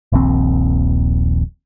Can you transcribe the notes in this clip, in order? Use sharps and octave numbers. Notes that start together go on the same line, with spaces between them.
D#1 A#1 D#2 C4